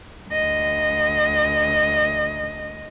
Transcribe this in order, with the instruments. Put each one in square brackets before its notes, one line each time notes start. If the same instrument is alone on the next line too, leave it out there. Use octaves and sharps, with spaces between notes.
[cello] D2 D#5